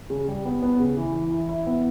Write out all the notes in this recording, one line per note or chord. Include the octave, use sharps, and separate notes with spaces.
C#3
G3
B3
B3
C#3
E3
E3
E4
E4
B3